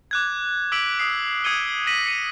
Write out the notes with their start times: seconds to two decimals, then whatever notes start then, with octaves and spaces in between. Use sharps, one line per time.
0.11 D6 F#6 G#6
0.72 D6 E6 B6 D7 F#7
0.99 D#6 C7
1.44 D#6 G#6 C#7 D#7 G7
1.87 D6 G#6 A#6 B6 D#7 F#7
2.06 C#7 D#7